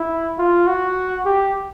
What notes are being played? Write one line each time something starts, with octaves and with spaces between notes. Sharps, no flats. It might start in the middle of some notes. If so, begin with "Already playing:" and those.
Already playing: E4
F4
F#4
G4